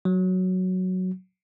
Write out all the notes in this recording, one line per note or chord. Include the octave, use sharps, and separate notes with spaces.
F#3